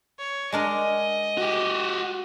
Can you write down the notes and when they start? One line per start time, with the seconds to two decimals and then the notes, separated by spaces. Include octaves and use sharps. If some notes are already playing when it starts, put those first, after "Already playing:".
0.19 C#5
0.52 G#3 D4 A#4 D#5
1.37 F#4 G4